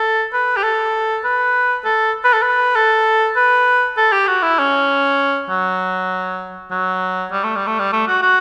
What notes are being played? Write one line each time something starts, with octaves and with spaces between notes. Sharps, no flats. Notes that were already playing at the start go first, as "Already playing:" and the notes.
Already playing: A4
B4
G4
A4
B4
A4
B4
A4
B4
A4
B4
A4
G4
F#4
E4
C#4
F#3
F#3
G3
A3
G3
A3
G3
A3
F#4
F#4